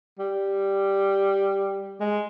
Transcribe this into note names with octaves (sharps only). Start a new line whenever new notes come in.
G3
G#3